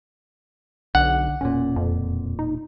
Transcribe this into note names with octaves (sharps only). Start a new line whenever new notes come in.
B1 D3 F#5
E1 A#2 C#4
F2
D#4